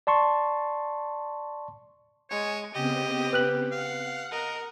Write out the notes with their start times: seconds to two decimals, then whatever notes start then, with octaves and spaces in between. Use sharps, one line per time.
0.07 D5 A5 C6 C#6
2.30 G#3 C#5
2.74 C#3 B3 C4 G4 D#5
3.33 B4 F#6 F#7
3.72 F5 F#5
4.32 A#4 D#5